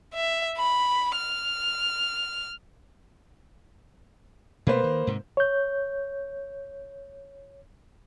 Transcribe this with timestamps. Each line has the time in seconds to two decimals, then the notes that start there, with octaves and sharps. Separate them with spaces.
0.14 E5
0.58 B5
1.17 F6
4.67 B2 A3 A#3 B4 C5
4.84 D#3
5.07 G#2 C3
5.37 C#5 G6